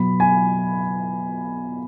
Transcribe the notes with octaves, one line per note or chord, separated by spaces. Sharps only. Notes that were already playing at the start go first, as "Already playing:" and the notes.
Already playing: B2 F#3 B5
G#5